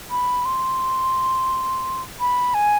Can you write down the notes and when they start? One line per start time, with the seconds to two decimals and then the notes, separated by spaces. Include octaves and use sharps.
0.11 B5
0.45 C6
2.20 B5
2.54 G#5